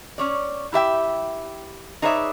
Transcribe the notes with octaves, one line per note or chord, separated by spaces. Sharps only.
C#4 C#5 D5
E4 G4 E5 G5
D#4 G#4 B4 C#5 D5 E5